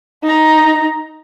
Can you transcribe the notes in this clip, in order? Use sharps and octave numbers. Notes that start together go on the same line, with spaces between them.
D#4 A#5